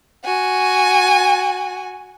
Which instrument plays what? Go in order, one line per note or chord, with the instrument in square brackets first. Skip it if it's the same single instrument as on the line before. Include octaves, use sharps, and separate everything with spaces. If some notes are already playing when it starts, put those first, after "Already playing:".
[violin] F#4 G#5